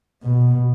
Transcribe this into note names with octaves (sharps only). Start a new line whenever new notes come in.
B2